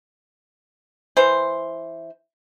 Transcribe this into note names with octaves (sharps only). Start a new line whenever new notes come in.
E3 C5